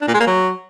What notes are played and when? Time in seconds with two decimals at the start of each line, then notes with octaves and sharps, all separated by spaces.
0.01 D4
0.08 A#2
0.14 G#3
0.20 A#3
0.27 F#3